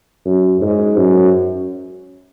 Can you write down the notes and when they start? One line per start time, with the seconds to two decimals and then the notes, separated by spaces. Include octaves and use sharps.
0.25 F#2
0.61 G#2
0.97 F#2